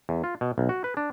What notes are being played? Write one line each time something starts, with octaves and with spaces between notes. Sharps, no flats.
E2
F4
B2
B1
F#4
B4
D4